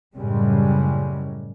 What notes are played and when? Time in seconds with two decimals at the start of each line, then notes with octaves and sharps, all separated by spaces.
0.15 F#2 A2 C#3 G3 G#3